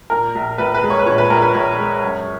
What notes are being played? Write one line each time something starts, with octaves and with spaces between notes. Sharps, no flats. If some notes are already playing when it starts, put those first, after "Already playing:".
A#2 A#4
A#1
A#1 B4
B4
G#3
C#5
B4
A#2 C#5
B4
A#1 A#4
B4
A#1 C#5
G#3
F#2